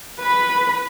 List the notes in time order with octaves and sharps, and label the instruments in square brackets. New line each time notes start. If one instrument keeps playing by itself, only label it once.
[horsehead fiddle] B4 B5